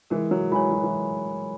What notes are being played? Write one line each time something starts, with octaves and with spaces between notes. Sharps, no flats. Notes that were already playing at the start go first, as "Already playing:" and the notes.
E3 G#3 A#4
F#3
E3 G#3 C#5 G#5 B5
F#3
E3